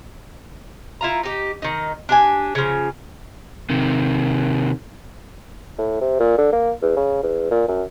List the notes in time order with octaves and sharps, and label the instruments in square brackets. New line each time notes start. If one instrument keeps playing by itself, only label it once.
[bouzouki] E4 F4 A#5
D#4 G4
D#3 D#4
D4 G4 G#5
C#3 F3
[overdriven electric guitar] C3 D#3
[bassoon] A2
C3
A#2
D3
A#3
E2
C#3
E2
A#2
F#2